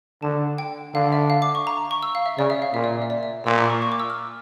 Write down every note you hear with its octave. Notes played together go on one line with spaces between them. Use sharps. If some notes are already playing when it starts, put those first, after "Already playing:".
D3 A5
G5
D3 F5
E5
F5
D6
C#6
A#5
C#6
E6
F5
E5
C#3 D5
E5
F5
A#2 E5
D5
E5
D5
E5
A#2 E6
D6
C#6
C#6
D6
E6
F6